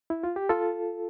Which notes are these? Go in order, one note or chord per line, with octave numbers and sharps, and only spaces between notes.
E4
F4
G4
F4 A4